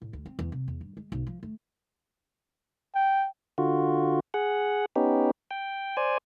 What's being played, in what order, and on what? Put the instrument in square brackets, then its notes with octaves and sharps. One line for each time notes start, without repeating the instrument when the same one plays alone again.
[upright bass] A2
D2
C4
E2
C3
E2
G2
G#3
B1
F3
A3
[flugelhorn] G5
[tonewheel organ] D3 F4 F#4
G#4 F#5
B3 C#4 D#4 G4
G5
C5 D5 G#5